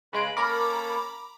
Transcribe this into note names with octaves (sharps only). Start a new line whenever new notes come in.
C#3 G#3 B4 B5 D7
A#3 C#4 A4 A#4 A#5 B5 D6